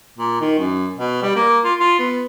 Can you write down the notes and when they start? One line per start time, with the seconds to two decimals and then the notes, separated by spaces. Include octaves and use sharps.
0.18 A#2
0.41 D#3
0.58 F#2
0.97 B2
1.22 G3
1.36 A#3
1.65 F4
1.80 F4
1.99 B3